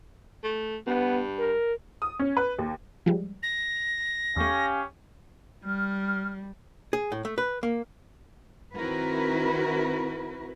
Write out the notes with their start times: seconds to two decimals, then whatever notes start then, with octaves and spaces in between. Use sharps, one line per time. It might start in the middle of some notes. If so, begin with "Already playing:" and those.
0.44 A3
0.87 G2 B3
1.39 A#4
2.02 D#6
2.19 C#4
2.37 B4
2.58 D#2
3.06 F3 G3 G#3
3.42 A#6
4.37 E2 A3 C#4 G4 F5
5.64 G3 F6
6.93 G#4
7.12 A2
7.25 A3
7.38 B4
7.63 A#3
8.74 D#3 C4 E4 F#4 A#4 B4